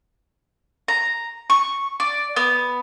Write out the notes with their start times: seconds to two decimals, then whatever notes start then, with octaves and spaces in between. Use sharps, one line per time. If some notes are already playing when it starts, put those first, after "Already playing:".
0.88 A#5
1.50 C#6
2.00 D5
2.36 B3